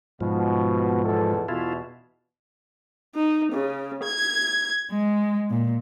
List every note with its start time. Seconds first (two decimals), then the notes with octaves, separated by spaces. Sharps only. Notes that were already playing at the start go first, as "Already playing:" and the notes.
0.21 G#2 B2 F3
1.03 E2 B2 A4
1.49 E2 B2 E4 F4
3.15 D#4
3.52 C#3
4.03 G#6
4.90 G#3
5.49 A#2